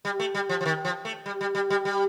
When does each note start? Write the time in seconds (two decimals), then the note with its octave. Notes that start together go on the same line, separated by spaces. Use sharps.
0.05 G3
0.20 A3
0.35 G3
0.49 F3
0.61 F3
0.66 D#3
0.85 F3
1.05 A3
1.26 G3
1.41 G3
1.55 G3
1.70 G3
1.85 G3